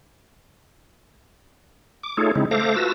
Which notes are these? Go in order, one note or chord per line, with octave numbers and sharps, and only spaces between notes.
D6
A3 D#4 F4 G#4 A4 C#5
C#3 G#3 C4 D#4 E4
A3 A4 C5 F5 D6 A#6
F4 F#4 B4 A5 E6 A#6